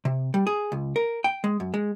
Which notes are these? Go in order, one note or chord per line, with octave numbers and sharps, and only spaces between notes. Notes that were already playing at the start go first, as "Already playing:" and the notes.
C3
G3
G#4
C#2
A#4
G5
G#3
F#2
G#3